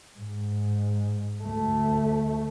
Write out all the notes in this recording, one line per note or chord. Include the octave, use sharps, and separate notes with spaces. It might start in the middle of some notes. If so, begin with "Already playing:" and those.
G#2
D2 A3